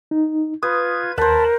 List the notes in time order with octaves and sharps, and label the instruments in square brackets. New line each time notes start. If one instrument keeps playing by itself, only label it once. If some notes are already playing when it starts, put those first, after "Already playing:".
[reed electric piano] D#4
[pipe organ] F4 G#6 [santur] B4 [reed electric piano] D#6
[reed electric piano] D#2 [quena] A#4 [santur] C5 F#5 [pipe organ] A5 B5